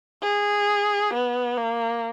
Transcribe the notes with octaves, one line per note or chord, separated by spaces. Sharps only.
G#4
B3
A#3